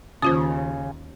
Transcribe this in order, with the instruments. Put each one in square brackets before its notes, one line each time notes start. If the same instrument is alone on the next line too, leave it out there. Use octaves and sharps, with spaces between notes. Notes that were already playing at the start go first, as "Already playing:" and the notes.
[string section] D#2 [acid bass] C#3 [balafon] C#4 F4 C5 [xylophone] D#6